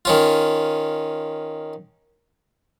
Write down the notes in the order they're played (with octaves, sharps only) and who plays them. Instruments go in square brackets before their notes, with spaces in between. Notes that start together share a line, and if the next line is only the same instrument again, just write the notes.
[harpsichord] D#3 C#4 F4